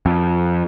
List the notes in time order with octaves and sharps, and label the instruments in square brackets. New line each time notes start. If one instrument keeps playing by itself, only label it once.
[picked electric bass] F2